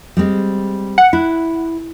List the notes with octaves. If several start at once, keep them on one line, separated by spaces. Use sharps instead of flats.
G3 G#3 C4
F#5
E4